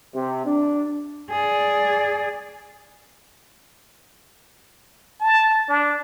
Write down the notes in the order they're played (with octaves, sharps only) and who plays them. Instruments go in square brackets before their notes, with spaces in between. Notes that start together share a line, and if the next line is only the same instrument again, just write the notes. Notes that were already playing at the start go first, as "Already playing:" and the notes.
[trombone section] C3
D4
[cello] G#4 D5
[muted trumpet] A5
D4